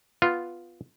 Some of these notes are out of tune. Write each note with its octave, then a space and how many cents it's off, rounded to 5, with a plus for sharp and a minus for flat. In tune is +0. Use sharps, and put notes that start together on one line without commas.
B3 +0 F4 +0